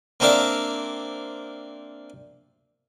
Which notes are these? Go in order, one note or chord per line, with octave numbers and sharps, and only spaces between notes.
A#3 C4 D4 A#4 E5 F5